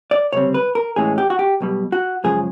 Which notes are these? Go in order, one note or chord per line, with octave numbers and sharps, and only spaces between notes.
D5
D2 C#3 G3 C4 C#5
B4
A#4
A2 E3 G#3 C#4 G#4
G4
F#4
G4
B1 B2 G3
F#4
F#2 C#3 F3 G#3 G#4